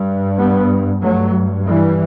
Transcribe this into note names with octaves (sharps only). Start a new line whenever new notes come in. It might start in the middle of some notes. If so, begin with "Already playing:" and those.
Already playing: G2
G3 B3
G2 F#3 A3
E3 G3